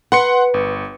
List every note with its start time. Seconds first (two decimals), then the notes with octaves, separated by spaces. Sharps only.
0.12 B4 F#5 C6 C#7
0.54 G1